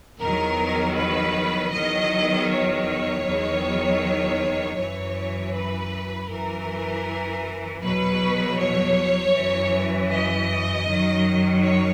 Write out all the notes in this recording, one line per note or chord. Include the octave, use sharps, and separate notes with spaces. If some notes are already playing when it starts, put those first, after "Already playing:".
E2 D#3 F#3 A#4
B4
E2 D#3 F#3 D#5
C#5
E2 D#3 F#3
F#2 E3 C#5
B4
F#2 E3 A#4
E2 B2 F#3 B4
C#5
F#2 E3
D#5
F#2 D#3 F#3
C#5